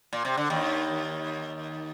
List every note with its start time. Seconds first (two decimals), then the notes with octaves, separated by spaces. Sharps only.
0.13 A#2
0.25 C3
0.37 D3
0.50 D#2 D#3